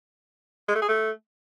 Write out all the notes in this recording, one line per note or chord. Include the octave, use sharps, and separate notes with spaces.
G#3
A3
G#4
A3